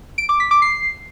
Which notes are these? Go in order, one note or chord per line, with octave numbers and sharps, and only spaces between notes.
D7
D6
B6
D6
C7